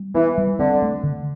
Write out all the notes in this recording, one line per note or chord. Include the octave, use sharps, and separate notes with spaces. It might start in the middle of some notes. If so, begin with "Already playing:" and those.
Already playing: G3
E3 B3
G3
D3 C4
A3
D3